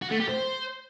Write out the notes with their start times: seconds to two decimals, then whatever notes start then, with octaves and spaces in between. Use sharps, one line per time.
0.02 F#4
0.11 A3
0.20 G4
0.29 C5